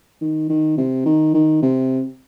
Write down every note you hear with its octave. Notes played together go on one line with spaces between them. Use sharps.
D#3
D#3
C3
D#3
D#3
C3